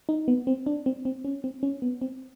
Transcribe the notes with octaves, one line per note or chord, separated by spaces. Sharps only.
D#4
B3
C4
D4
C4
C4
C#4
C4
C#4
B3
C4